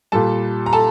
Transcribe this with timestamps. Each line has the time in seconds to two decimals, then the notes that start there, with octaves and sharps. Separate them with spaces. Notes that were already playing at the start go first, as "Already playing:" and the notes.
0.12 A#2 G3 A4 A5
0.66 A#5
0.73 A4 A5